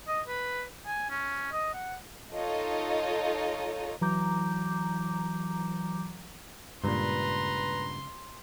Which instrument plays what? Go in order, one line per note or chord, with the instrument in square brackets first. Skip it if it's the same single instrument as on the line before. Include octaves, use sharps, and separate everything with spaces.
[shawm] D#5
B4
G#5
C#4
D#5
F#5
[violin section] D#4 F4 A4 C#5 D#5
[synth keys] E3 F#3 A#5 D6 G6
[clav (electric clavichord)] G2 A#2 [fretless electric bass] C#3 G#3 [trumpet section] B4 A#5 [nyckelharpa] C6